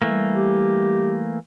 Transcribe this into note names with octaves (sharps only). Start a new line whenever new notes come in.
E3 G3 A3 A#3
G4